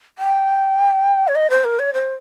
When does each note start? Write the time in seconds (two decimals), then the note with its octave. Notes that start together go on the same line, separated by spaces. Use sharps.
0.18 G5
1.28 C#5
1.35 D#5
1.50 C5
1.64 A#4
1.79 C#5
1.93 C5